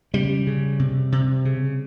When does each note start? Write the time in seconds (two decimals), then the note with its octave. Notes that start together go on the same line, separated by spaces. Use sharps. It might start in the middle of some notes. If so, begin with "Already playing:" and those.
0.14 C#3 G3
0.47 C#3
0.79 C3
1.12 C3
1.45 C#3